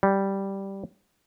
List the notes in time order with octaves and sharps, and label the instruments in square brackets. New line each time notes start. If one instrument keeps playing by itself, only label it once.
[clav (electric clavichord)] G3